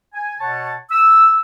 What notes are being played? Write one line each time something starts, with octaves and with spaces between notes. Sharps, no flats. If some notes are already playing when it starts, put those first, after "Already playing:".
G#5
B2 C#5 F#5 A5
E6